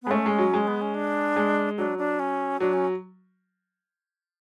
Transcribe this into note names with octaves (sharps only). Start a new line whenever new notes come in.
G#3 B3
A3 C#4
G#3
F#3
G#3
B3
C#4
D4
G#3
F#3 D4
D4
C#4
F#3 D4
C#4